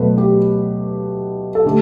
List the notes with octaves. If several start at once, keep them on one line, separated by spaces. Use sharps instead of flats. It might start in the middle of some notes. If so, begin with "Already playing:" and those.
Already playing: B2 F#3 A3 B4
G4
A4
D3 A3 G4